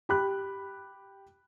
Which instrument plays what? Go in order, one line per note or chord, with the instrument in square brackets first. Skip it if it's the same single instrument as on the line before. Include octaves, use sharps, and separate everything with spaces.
[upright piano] G4 B5 F#6